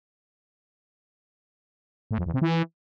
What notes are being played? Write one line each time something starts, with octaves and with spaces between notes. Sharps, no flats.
A2
F2
E2
C3
E3